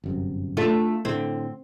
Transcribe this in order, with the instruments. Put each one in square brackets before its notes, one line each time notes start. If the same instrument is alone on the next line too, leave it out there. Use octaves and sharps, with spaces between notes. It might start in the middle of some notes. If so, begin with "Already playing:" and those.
[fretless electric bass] G1 F#2 C3
[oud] A3 D4 F4
[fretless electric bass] A2 D3 [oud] C4